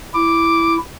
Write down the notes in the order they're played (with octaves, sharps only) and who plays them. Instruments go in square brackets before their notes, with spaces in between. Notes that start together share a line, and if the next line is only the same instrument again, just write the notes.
[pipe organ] E4 [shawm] D6